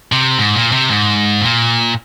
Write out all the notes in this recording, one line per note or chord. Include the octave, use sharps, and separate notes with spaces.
C3
G#2
A#2
C3
G#2
A#2